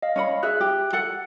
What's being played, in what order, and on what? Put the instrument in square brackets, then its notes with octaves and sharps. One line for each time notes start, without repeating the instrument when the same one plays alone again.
[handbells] D#5 F5
[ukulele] C#4 C#5 B5
[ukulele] G#4 E5 [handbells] F#6
[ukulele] G4
A4 F#5